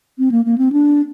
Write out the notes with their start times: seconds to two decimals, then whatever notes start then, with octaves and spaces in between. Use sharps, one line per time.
0.19 C4
0.32 A#3
0.45 A#3
0.58 C4
0.72 D4